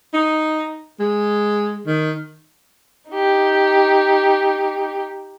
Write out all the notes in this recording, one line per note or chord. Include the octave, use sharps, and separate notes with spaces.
D#4
G#3
D#3
D#4 G4